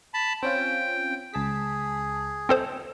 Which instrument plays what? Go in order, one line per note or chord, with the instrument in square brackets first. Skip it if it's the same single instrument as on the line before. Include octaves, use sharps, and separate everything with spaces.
[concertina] A5 B5
[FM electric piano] C4 C#4 F4 [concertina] G5
[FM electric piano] C#2 A5 B6 [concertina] G#4
[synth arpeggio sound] C4 A4 C5